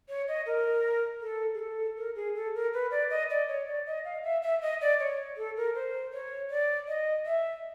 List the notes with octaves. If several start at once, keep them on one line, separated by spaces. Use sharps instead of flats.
C#5
D#5
A#4
A4
G#4
A4
A#4
G#4
A4
A#4
B4
D5
D#5
D5
C#5
D5
D#5
F5
E5
E5
D#5
D5
C#5
A4
A#4
C5
C#5
D5
D#5
E5